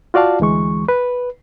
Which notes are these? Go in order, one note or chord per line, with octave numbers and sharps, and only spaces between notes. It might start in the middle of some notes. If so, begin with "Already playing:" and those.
F4 F#4 D5 F5 A5
D2 E3 G#3 C#6
B4